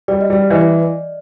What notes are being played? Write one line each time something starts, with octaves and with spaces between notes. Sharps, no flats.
G3 D5
D#5
G3 D5
E3 D#5